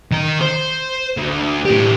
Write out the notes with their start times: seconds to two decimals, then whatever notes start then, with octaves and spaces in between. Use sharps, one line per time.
0.12 D#3 A#4
0.41 C5
1.17 D2
1.65 A2 G4